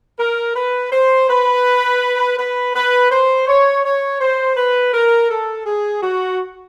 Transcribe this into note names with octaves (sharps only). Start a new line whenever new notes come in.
A#4
B4
C5
B4
B4
B4
C5
C#5
C#5
C5
B4
A#4
A4
G#4
F#4